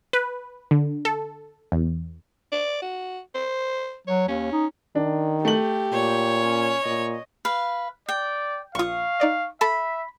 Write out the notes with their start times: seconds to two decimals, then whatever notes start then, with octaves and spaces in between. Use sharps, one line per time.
0.13 B4
0.71 D3
1.05 A4
1.72 E2
2.52 D5
2.82 F#4
3.35 C5
4.07 F#3 C#5
4.28 D#2 C#4
4.52 D#4
4.95 D#3 D4
5.45 A3 G4 F#7
5.93 A#2 C#5
6.40 C#4
6.85 A#2 D#5
7.45 B4 F5
8.09 D5 G5
8.75 A#1 F4 F5 C#6 D#6
9.20 D#4 D5 D#5
9.61 A4 E5 A5 B5